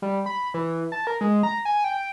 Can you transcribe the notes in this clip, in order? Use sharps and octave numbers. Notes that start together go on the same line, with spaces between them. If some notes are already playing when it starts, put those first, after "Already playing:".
G3
B5
E3
A5
A#4
G#3
A#5
G#5
G5